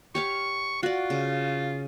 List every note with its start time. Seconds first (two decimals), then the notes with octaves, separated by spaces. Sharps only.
0.15 G4 C#5 F5 C#6
0.83 F4 F#4 D5
1.10 C#3